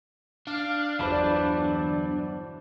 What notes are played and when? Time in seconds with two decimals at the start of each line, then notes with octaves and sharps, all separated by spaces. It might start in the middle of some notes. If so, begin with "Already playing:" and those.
0.47 D4 F5
0.99 G1 E2 E3 F#3 C5 D5 A5 B5